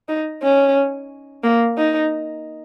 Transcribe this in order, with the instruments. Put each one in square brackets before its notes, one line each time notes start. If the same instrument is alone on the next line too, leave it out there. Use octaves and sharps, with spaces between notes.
[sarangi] D#4
C#4
A#3
D#4